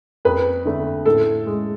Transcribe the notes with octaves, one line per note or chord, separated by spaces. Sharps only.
F2 B4
D3 A3
A2 A4
G#3